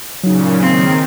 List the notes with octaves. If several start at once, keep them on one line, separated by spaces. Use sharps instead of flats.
A#2 C#3 F#3 D#4
D#3 C4